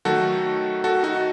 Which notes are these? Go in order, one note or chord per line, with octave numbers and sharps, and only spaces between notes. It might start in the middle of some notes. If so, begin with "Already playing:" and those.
D#3 F#3 A3 F#4 A4
F#4 A4
D#4 F#4